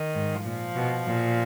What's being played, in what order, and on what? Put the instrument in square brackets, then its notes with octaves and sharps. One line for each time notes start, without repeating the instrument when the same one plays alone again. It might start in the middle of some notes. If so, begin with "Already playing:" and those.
Already playing: [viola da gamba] D#3
[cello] G#2
[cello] A#2 [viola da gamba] F3
[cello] B2
A#2